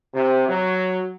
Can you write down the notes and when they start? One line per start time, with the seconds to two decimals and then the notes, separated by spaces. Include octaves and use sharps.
0.13 C3
0.48 F#3